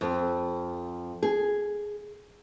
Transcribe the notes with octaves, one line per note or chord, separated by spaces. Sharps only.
F2
G#4